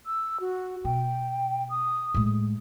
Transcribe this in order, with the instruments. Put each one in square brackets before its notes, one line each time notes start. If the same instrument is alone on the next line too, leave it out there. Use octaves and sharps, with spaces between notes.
[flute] E6
F#4
[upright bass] B2 [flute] G5
[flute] D#6
[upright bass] A2 G#3